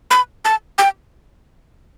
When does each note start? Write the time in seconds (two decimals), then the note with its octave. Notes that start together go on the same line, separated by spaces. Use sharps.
0.11 B5
0.45 A5
0.78 G5